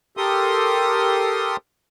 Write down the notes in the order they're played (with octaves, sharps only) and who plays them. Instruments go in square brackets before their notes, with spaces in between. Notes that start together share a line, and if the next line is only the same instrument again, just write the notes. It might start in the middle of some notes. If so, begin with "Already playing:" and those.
[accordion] G4 A4 A#4 C6 D#6